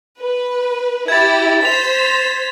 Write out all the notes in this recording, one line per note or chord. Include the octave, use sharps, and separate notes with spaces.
B4
E4 G4 G#6 A6
C5 B6 F7